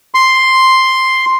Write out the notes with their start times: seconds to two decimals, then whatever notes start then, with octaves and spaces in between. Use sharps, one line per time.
0.14 C6